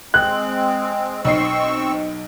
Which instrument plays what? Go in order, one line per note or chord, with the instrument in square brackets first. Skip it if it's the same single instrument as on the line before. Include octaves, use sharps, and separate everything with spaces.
[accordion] G#3 C4 [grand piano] F#6
[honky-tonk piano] B1 D#5 C7 [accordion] C4 C#6 E6